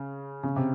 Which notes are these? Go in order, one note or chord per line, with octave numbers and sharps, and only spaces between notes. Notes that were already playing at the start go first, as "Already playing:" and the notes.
Already playing: C#3
C#3
C3